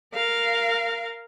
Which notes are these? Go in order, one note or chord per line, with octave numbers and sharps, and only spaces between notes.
A#4 F5